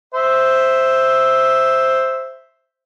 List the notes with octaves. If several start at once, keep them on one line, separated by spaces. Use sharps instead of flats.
C5 E5